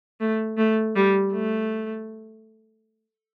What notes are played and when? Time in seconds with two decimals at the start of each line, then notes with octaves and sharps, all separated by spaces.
0.20 A3
0.58 A3
0.95 G3
1.32 A3